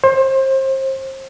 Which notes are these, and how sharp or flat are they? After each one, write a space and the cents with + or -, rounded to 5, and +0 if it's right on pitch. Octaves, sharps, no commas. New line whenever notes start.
C5 +30